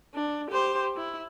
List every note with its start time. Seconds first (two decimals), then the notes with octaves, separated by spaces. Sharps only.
0.14 D4
0.51 G4 C5
0.97 E4